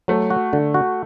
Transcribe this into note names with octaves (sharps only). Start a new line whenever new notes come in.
F#3 A3
F#4
D3
F#4